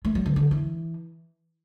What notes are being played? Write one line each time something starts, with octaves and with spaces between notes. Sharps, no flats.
A3
F#3
D3
D3
E3